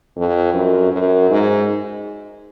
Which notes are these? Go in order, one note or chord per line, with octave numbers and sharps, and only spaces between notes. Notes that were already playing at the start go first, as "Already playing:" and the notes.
F2
F#2
F#2
G#2